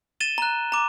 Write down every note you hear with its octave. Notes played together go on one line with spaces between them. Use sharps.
A6 D#7 E7 G7
A#5 F#6
A#5 D6